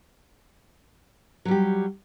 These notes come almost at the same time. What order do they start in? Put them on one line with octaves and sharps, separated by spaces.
F#3 G3 G4